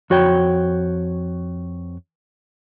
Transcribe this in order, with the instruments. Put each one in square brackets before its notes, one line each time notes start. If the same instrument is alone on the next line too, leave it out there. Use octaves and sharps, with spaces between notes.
[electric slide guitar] F2 F#4 C#5 G5